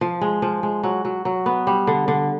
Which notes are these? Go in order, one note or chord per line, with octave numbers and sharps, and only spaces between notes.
F3
G#3
F3
G#3
F#3
F#3
F#3
B3
G3
D3
D3